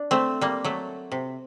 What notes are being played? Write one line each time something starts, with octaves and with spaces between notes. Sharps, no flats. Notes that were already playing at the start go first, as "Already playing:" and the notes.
Already playing: D4
A3 C4
G3 A#3
F#3 A3
C3